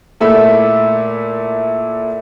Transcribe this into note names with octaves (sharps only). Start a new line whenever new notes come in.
A#2 A3 E4 E5